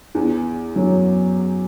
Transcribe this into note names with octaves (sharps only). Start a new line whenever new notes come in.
E2 E3
F#2 F#3